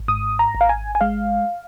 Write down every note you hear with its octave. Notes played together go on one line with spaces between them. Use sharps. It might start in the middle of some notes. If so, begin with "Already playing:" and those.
Already playing: G#1
G#2 D#6
A#5
G#1
F5
G#5
G#5
G#3 F5